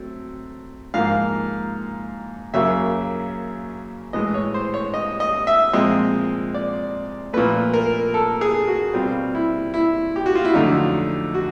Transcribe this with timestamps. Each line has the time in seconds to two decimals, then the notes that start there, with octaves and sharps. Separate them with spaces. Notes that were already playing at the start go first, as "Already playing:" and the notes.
Already playing: F#3 A3 C4
0.94 G#2 F3 A#3 F5
2.54 F#2 C#3 F#3 A#3 E5
4.13 A2 E3 G#3 D#5
4.34 C#5
4.54 C5
4.74 C#5
4.94 D#5
5.20 D#5
5.47 E5
5.73 A#2 F3 G#3 C4 D#5
6.54 D5
7.33 A#2 F3 A3 B4
7.74 A#4
8.14 A4
8.41 G#4
8.67 F#4
8.94 B2 G3 C4 F4
9.35 E4
9.74 E4
10.16 G4
10.26 F#4
10.35 F4
10.45 E4
10.54 F2 D3 F#3 A3 D#4
11.34 F#4